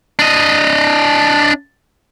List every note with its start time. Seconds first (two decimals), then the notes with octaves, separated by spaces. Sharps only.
0.19 D4 D#5